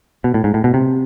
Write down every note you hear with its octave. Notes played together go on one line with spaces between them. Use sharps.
B2
A2
G#2
A2
B2
C3